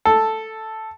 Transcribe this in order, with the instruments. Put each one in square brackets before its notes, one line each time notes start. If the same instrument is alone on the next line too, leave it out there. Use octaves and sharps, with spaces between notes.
[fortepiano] A4